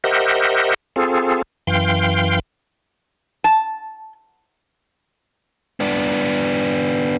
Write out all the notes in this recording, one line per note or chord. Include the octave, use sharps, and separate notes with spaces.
G4 A#4 C5 D#5 E5 F#5
C4 F4 G#4 A4
F#2 E3 F5 G5 C6
A5
B3 D4